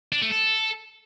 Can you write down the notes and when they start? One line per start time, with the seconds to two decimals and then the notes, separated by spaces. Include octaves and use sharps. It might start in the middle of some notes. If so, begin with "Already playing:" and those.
0.12 D4
0.22 A3
0.31 A4